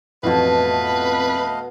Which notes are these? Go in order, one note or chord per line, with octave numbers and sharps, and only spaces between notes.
A1 F2 B2 A3 B4 D#5 F5 A5